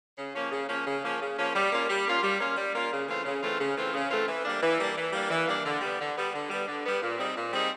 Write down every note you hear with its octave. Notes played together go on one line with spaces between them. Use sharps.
C#3
F3 A#3 C#4
C#3
F3 A#3 C#4
C#3
F3 A#3 C#4
C#3
F3 A#3 C#4
G3
A#3 C#4 F4
G3
A#3 C#4 F4
G3
A#3 C#4 F4
G3
A#3 C#4 F4
C#3
E3 A3 C4 F4
C#3
E3 A3 C4 F4
C#3
E3 A3 C4 F4
C#3
E3 A3 C4 F4
E3
G3 A#3 D4
E3
G3 A#3 D4
E3
G3 A#3 D4
E3
G3 A#3 D4
D3
G3 B3
D3
G3 B3
D3
G3 B3
D3
G3 B3
A#2
G3 C4 D#4 G#4
A#2
G3 C4 D#4 G#4